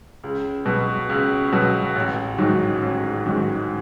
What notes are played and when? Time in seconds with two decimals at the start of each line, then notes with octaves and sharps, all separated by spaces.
0.24 C#2
0.65 B2 F#3 B3
1.09 C#2
1.52 B2 F#3 B3
1.95 A1
2.38 G#2 D#3 F#3
2.82 A1
3.26 G#2 D#3 F#3